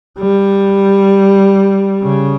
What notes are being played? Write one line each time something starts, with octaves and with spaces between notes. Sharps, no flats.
G3
C#3